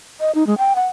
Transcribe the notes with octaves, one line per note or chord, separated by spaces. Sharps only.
D#5
D#4
G#3
G5
F#5